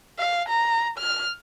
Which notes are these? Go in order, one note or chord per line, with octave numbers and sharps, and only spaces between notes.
F5
A#5
F6